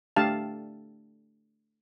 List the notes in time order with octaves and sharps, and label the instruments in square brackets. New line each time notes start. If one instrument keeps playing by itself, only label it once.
[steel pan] A3 D4 G4 F5 A5